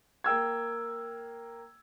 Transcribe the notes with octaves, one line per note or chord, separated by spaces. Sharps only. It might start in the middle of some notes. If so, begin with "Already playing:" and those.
A#3 G5 E6 G#6